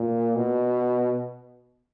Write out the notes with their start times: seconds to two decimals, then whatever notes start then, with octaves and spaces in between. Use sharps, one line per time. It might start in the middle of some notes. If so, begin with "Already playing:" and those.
Already playing: A#2
0.36 B2